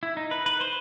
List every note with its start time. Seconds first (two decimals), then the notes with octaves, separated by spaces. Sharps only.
0.03 E4
0.17 D#4
0.31 B4
0.46 B4
0.61 C5